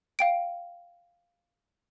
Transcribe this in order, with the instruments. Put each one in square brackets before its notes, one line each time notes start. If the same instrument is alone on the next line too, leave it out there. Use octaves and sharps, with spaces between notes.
[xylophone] F5 G5 D7